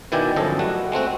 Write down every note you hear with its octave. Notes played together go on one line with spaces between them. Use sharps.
B2 D#3 E4 D5 G5 G#5
G1 F#2 F3 G#4 A4 D#5
G3 A3 F#4
G#3 A3 C4 F#4